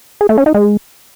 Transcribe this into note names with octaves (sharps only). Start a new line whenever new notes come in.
G#4
A3
C#4
D#4
G#3